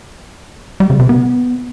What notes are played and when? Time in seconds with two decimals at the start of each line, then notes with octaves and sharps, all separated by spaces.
0.80 G3
0.90 C#3
0.99 C3
1.09 B3